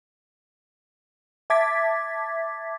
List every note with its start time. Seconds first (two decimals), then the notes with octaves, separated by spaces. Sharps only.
1.50 E5 A5 D6 G#6 A6 B6